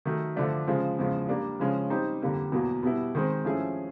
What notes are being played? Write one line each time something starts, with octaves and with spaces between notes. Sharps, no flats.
D#3 F#3 A3
D3 F3 A3 D4
C#3 F3 G#3
E2 C#3 F3 G#3
G3 A#3 D4
C#3 F3 G#3 C#4
G3 C4 D#4 G4 C5
F2 D3 G3 A#3
E2 B2 F#3 A#3
B2 G3 B3 E4
D#3 G#3 C4
F3 A3 C#4 E4 G#4